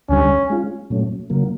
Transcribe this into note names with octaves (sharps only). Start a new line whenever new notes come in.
D2 D3 G3 C#4
G#3 C#4 F4
A#2 F#3 A3 C#4
C#3 F#3 A#3